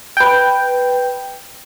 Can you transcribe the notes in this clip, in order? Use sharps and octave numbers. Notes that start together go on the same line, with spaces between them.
B4 G5